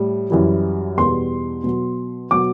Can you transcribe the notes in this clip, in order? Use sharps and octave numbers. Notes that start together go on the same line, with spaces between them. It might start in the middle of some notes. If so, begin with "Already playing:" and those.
Already playing: A2 G3
F#2 E3 G3
E2 B2 G3 C6
B2 F#3
B2 F#3 D6